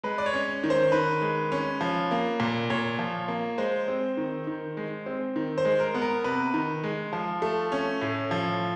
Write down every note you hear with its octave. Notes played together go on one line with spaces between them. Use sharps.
G#3 B4
D5
C#5
C#4
D#3
C5
D#3 B4
G#3
C#4
F3
A#3
A#2
A#2 C#5
F3
A#3
G#3 C5
C4
D#3
D#3
G#3
C4
D#3
C5
G#3
A#4
B3
A#4
C3 B4
D#3
G#3
F3
A3
C#4
A2
F3